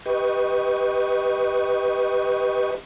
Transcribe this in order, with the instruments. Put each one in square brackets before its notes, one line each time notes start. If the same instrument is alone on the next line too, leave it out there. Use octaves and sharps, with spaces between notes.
[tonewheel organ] G4 B4 D#5 C#6